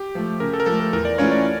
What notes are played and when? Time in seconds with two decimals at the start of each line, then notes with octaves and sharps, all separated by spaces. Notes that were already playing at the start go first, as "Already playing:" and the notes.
Already playing: G4
0.15 F3 A3
0.40 C#3 A#4
0.53 A4
0.60 A#4
0.66 F3 A3 A4
0.80 A#4
0.93 E2 A#4
1.05 D5
1.18 E3 A3 C#4 F4 C#5
1.32 D5